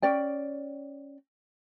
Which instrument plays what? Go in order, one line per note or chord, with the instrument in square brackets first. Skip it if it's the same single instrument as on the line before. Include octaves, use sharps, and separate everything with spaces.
[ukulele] C#4 D5 G5